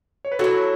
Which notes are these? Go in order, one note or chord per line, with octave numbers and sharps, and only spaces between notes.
C#5
B4
F#3 A3 E4 F#4 A4